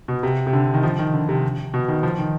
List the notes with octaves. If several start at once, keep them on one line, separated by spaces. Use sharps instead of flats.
B2
C3
C3
D3
D#3
F3
D#3
D3
C3
B2
D#3
F3
D#3